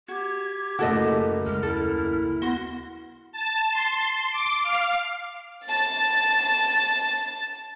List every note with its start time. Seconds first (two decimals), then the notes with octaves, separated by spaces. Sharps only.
0.08 F#4 G4 G#6
0.79 F#1 C#3 A3 E4 F#4 A4 D#5
1.46 D#2 C#3 G#3 F6
1.63 E4 A4
2.42 B3 F#4 C6 A#6
3.32 A5
3.71 C6
4.31 D6
4.63 F5
5.66 A5 A6